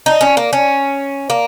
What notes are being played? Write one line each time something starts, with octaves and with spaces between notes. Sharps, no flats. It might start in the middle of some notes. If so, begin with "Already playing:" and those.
D#4
C#4
A#3
C#4
A#3